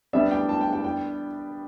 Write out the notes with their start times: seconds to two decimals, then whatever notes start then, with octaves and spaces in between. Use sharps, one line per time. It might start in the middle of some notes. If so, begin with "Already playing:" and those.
0.13 G3 B3 D4 E5
0.31 G5
0.49 A5
0.61 G5
0.73 G5
0.84 G5